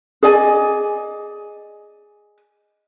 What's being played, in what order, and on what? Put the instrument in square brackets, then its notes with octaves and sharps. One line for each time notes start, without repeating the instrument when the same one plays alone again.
[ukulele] G#4 D5 D#5 G#5